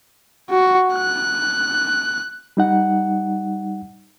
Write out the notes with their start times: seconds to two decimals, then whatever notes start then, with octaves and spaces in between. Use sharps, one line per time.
0.50 F#4
0.94 F#6
2.57 G3 D#4 F#5